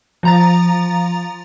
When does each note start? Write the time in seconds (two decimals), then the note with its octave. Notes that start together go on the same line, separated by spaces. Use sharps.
0.23 F3 A#5 A6